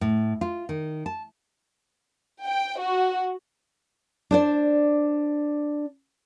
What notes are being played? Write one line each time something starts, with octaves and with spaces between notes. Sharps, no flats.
A2
F4
D#3
A5
G5
F#4
D4 C5 D5